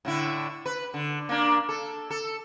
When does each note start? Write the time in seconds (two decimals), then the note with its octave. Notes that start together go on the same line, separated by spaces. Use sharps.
0.05 A2 D3 E4
0.66 B4
0.94 D3
1.29 A#3 D4
1.69 A4
2.10 A4